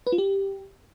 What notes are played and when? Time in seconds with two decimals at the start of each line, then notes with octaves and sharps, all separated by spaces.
0.07 B4
0.12 F4
0.18 G4